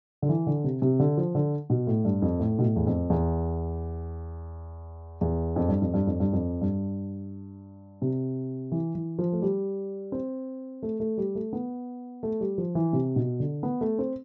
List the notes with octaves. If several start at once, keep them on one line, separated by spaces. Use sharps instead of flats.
D3
E3
D3
C3
C3
D3
F3
D3
B2
A2
G2
F2
A2
B2
A2
E2
F2
E2
E2
F2
G2
F2
G2
F2
G2
F2
G2
C3
E3
E3
F3
A3
G3
C4
A3
A3
G3
A3
B3
A3
G3
F3
E3
C3
B2
D3
B3
A3
C4